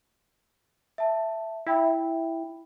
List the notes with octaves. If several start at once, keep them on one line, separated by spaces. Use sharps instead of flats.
E5 A5
E4 E5 G5 B5